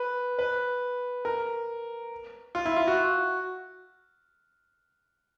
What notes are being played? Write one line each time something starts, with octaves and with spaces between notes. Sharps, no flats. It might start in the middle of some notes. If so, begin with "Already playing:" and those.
Already playing: B4
B4
A#4
F4
E4
F4
F#4